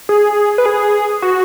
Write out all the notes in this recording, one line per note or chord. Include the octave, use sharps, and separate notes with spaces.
G#4
B4
G#4
F#4